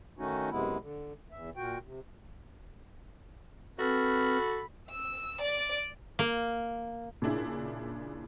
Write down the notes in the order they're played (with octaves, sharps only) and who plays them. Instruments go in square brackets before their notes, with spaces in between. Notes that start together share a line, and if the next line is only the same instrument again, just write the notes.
[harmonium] D#3 A3 C#4 D#4 F#4
F#2 C3 G#3 B3 E4
D3
E2 E5
A#2 F#4 G5
C3
[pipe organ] C4 B4 F6 [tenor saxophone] F#4 [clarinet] A4 [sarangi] B5
[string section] E6
D5
[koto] A#3
[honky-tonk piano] A#2 C#3 D4 E4 G#4